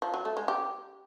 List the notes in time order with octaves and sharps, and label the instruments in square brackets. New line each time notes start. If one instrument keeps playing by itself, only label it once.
[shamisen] F3
F#3
A3
G#3
G4